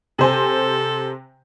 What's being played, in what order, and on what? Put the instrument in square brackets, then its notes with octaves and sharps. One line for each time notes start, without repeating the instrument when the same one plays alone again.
[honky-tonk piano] C3 C5 G#5 [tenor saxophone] A4